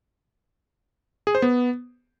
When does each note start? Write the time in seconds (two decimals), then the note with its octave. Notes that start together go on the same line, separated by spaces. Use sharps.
1.27 G#4
1.35 C5
1.42 B3